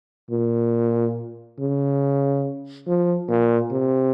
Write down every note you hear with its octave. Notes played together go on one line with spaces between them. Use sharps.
A#2
C#3
F3
A#2
C3